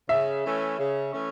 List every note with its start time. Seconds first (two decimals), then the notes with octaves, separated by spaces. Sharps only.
0.09 C#3 E5
0.43 E3 A3 C#4
0.78 C#3
1.13 E3 A3 C#4